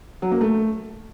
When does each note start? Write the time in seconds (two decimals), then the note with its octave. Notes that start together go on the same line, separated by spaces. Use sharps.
0.22 F#3
0.32 A#3
0.41 A3